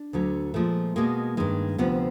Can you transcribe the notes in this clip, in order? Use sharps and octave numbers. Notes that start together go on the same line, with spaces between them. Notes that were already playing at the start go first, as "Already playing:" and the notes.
Already playing: D4
D2 D3 F#3
A#2 F3 G#3 A3
B2 G#3 A#3
G2 D#3 G#3
D2 C3 F3 B3